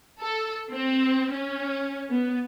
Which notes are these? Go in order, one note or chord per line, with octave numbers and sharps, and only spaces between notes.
A4
C4
C#4
B3